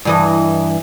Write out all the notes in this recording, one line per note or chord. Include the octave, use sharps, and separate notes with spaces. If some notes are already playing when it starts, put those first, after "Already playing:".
G2 E3 D#5